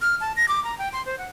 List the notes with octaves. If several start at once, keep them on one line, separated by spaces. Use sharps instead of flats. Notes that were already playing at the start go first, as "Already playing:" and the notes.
F6
A5
A#6
D6
A#5
G5
C6
C5
F#5